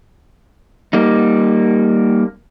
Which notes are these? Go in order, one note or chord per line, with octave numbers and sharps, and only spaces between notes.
G3 A#3 D#4